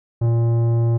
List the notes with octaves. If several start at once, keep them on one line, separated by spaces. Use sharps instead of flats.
A#2